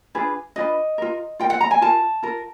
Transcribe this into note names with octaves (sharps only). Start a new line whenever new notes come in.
D4 F4 G#4 B4
D4 F4 G#4 B4 D#5
F4 A#4
F4 A#4 G5
F#5
A#5
G#5
F4 A#4 A5
F4 A#4